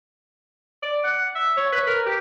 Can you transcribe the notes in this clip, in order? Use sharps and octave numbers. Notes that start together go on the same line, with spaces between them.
D5
F#5
E5
C#5
B4
A#4
G4